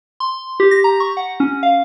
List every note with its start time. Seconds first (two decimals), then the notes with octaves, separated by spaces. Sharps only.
0.20 C6
0.60 G4
0.71 A#6
0.84 A#5
1.00 C#6
1.17 F#5
1.40 C#4
1.63 F5